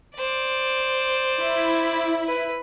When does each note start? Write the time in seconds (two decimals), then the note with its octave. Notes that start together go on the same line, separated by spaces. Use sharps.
0.16 C5 D5
1.42 E4
2.27 B4